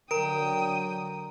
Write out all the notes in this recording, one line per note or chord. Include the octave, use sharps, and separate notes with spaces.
D3 F#3 A#4 G5 A#5 D#6 D7